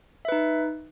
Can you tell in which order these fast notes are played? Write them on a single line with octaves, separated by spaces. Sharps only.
E5 B4 D#4